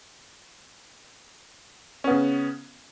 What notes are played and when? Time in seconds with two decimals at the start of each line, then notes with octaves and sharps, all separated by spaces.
2.04 C#4
2.07 B3
2.10 C#3